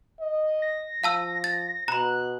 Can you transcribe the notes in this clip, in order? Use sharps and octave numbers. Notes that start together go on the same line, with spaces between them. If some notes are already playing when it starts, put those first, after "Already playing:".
D#5
A#6
F3 F5 A5 E6
A6
B2 A#5 B5 F#6